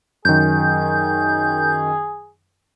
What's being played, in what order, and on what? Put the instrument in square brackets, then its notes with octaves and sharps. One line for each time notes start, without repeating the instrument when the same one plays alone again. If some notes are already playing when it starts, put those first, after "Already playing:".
[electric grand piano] F#2 D#3 [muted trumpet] G#4 [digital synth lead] G6